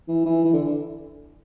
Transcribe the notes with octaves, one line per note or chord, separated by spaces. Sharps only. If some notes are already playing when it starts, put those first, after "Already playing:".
E3
E3
E3
D3